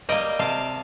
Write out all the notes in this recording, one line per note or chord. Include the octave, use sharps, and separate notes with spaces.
G3 A#3 D#5 G5
C3 F5 A5